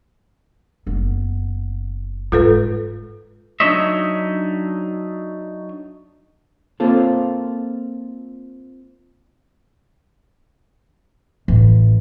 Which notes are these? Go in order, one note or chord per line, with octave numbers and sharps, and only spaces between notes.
F#1 B3
G#2 F4 A4 B4
F#3 D4 D#4 C#5 D#5 E5
A#3 C4 F4 A4
A1